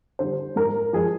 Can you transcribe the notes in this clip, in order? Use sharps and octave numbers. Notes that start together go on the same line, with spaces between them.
D3 G3 C5
G#2 A#4
F3 G#3 G#4